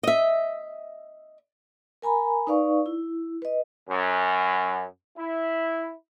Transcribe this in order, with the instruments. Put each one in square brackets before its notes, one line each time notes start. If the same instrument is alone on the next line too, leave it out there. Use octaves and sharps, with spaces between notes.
[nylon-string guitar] D#5 E5
[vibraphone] A#4 G#5 A#5 B5
D#4 B4 D5 F5 C#6
E4
B4 D#5
[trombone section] F#2
E4